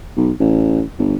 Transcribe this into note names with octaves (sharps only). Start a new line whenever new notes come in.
B1
A1
G1